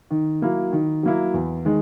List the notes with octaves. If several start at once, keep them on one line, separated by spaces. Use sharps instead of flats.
D#3
F#3 A#3 E4
D#3
F#3 A#3 E4
E2
D#3 G#3